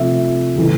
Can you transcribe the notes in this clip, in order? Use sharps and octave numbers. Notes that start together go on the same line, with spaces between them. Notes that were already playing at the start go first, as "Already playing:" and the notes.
Already playing: C3 F3 A3 E5
C#3 E3 A3